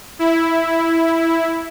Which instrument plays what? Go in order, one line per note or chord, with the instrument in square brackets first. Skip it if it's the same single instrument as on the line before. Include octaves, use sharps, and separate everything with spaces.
[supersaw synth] E4